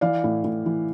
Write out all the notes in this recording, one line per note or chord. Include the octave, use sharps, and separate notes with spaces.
E3 D5 F5
A2
A2
E3